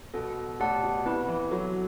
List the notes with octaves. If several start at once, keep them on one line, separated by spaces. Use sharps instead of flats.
B2 B3 F#4 A4
A2 G4 D5 F#5 A5
B2
C3 B3 E4 B4
E3
F#3 B3 F#4 A4